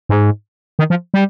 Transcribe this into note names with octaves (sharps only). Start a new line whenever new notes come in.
G#2
D#3
F3
G3